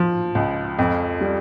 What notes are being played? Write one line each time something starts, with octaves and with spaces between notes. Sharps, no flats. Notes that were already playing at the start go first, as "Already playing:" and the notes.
Already playing: F3
C#2
F2
G3